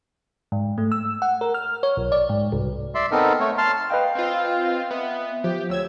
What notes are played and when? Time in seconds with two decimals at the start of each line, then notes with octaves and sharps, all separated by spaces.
0.52 G#2
0.78 A3
0.92 E6
1.22 F#5
1.41 A#4
1.54 F6
1.83 C#5
1.97 B1
2.12 D5
2.29 G#2
2.52 C2
2.95 D5 E5 C6
3.12 B3 C4 D#4 A4 A#4
3.40 A3 C#5
3.58 A5 C6 F6
3.90 B4 D#5 F5 G5
4.15 C4 F4
4.91 B3 E5
5.44 F3 G4
5.69 D2 C#5 E6 G#6